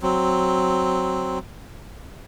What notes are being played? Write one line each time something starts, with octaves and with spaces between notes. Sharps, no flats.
F#3 C4